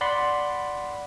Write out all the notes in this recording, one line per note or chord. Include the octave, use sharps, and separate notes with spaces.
D5 F#5 B5 C6